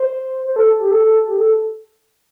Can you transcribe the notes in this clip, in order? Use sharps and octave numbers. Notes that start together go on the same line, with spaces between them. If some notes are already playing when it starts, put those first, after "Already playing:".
Already playing: C5
C5
A4
G4
A4
A4
G4
A4